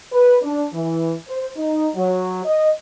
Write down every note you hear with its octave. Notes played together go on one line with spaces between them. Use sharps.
B4
D4
E3
C5
D#4
F#3
D#5